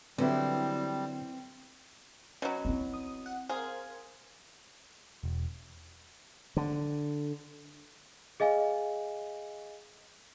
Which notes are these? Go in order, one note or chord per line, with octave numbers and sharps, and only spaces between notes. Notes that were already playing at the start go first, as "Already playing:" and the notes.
D3 F#3 G3 B3 C4 E4
B2 F#3 C#4
C4 E4
D#6
F#5
G#4 A#4 C5 F5
E1
D3
G#4 D#5 F5 G#5